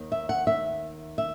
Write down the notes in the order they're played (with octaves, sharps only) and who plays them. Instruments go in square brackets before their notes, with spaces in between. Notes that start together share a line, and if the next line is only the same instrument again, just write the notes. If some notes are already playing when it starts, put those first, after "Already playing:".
Already playing: [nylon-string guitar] D#2 D#3
E5
F#5
E5
E5